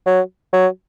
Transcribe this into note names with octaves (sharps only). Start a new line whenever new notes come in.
F#3
F#3